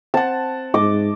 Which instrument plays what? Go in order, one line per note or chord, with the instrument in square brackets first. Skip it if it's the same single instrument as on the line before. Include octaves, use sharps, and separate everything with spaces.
[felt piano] C4 F#5 [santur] A5
[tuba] G#2 [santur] D#5 D6